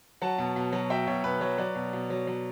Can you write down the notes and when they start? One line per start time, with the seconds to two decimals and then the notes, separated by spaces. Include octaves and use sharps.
0.22 F#3 F#5 A5
0.38 B2
0.56 B2
0.73 F#3
0.90 F#3 E5 G5
1.07 B2 C#5
1.24 B2 B4
1.41 F#3 C#5
1.58 F#3 B4 D5
1.75 B2
1.93 B2
2.10 F#3
2.27 F#3